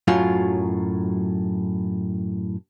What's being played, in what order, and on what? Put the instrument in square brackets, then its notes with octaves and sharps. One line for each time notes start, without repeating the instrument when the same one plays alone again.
[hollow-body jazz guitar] F#2 A2 F#3 F4